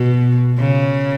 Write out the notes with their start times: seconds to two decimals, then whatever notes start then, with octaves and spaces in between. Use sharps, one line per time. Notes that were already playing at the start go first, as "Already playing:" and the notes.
Already playing: B2
0.58 C#3